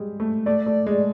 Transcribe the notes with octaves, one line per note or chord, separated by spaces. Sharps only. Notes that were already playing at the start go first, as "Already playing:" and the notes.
Already playing: G3 G#3
A3
A3 D5
A3
G#3